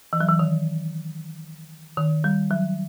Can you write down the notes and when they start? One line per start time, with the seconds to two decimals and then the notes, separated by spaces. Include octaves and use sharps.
0.13 E3
0.21 F#3
0.28 E3
0.39 D#3
1.97 D#3
2.24 G3
2.51 F#3